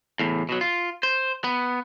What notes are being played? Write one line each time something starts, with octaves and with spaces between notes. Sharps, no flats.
E2 A2
B2 F#3
F4
C5
B3